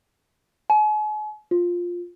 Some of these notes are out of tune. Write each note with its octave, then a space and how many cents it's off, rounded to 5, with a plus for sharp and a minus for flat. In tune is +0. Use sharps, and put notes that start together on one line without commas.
G#5 +40
F4 +5